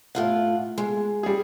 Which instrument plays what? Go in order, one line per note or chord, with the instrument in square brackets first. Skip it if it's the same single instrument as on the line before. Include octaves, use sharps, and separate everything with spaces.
[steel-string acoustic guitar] A2 F4 F#5
G#3
[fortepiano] G3 G#4